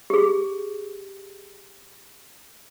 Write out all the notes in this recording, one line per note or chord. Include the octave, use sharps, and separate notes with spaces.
G4 G#4